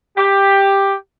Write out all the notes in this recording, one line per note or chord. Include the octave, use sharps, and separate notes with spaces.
G4